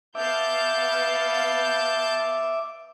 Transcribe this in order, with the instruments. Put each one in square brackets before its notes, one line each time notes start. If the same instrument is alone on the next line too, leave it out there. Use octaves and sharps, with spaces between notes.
[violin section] B3 F5 [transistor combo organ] E5 D6 [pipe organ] A5 G6